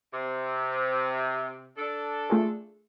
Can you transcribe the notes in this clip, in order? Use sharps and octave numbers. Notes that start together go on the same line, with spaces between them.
C3
D4 A4
A3 F4 G#4